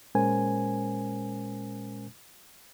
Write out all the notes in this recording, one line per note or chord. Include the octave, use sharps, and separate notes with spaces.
A#2 G#3 C#4 A#4 C5 G#5